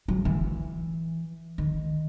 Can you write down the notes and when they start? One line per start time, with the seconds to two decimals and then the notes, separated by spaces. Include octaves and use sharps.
0.08 F#3
0.25 E3
1.58 D#3